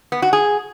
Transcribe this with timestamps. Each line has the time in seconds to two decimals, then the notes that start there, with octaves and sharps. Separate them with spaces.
0.12 B3
0.22 F#4
0.33 G#4